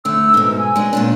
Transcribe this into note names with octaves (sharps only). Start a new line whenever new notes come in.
D3 A3 E6
G#2 B2
G#5
G#3 D4
A#2 C#4 D4